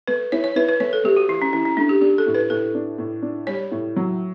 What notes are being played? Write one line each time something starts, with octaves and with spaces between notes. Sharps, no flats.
A3 B4
E4 C#5
C#5
E4 B4
B4
A3 C#5
A4
A3 G4
F#4
E3 E4
C#4
E3 C#4
C#4
A3 D4
G4
D4 G4
A4
A2
B4
A2 A4
D4
A2
D4
G3 C#5
A2
F#3